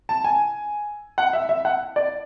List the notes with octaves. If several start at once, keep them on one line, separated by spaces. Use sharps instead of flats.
A5
G#5
F#5
E5
E5
F#5
D5